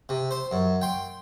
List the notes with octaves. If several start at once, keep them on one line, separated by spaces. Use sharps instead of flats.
C3
C5
F#2
G5 C6